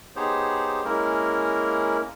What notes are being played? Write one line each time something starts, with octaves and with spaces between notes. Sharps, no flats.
B3 D#4 G4 G#4 C5 C#5
G#3 A#3 C#4 E4 A#4